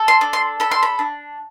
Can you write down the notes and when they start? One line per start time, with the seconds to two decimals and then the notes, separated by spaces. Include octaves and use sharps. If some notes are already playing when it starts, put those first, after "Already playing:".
Already playing: A4
0.08 C6
0.21 D4
0.33 C6
0.60 A4 B5
0.71 C6
0.83 B5
0.99 D4